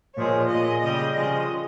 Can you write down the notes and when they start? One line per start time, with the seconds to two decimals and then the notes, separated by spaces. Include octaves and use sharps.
0.16 A#2 F3 G#3 C#5
0.49 A#2 G#3 D#5
0.83 C#3 G3 D#5
1.16 C#3 F3 G#3 D#5